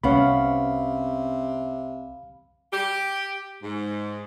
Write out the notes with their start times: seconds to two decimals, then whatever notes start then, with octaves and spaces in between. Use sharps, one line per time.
0.04 C2 C3 B3 C#4 F5 B5
2.72 G4
3.62 G#2